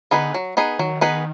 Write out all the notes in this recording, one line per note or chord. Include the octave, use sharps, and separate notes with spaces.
D3 B3 D#4 G#4 B4
F#3
B3 D#4 G#4 B4
D#3 F#3
B3 D#4 G#4 B4